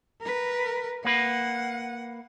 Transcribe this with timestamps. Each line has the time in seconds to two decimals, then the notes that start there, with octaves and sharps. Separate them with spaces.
0.21 A#4 B4
1.05 A#3 B4 F#5